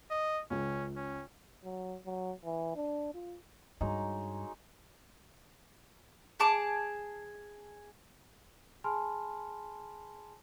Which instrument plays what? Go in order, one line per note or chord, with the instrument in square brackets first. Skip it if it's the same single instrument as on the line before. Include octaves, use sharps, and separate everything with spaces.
[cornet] D#5
[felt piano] C#2 [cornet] C#4
[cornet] C#4
[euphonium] F#3
F#3
E3
D4
F4
[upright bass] G2 [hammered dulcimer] F#3 G#3 D#4
[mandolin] G#4 A5 D6
[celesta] G#4 G#5 A5 B5 C6 F6